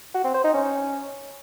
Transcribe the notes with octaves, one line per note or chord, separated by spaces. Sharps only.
F#4
C4
C5
D#4
C#4